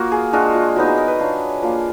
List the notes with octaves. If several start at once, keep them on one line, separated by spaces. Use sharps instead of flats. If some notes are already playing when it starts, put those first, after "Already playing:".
Already playing: A#3 F4 F#4
G#4
G#3 D4 F4 F#4
F4
F#3 B3 D#4 F#4
G#4
A#4
B4
F#3 D4 F4
F3 A#3 F4